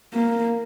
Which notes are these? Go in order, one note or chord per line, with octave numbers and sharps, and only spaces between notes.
A#3